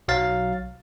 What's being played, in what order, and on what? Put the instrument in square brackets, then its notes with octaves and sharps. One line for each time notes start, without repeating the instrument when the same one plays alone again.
[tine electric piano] B1 F#3 F5 A6